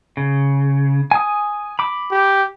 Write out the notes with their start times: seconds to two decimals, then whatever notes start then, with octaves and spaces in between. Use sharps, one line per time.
0.17 C#3
1.11 G#5 D#6
1.79 B5 D6
2.11 G4